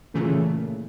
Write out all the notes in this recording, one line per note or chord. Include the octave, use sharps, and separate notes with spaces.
A#2 C#3 E3 A3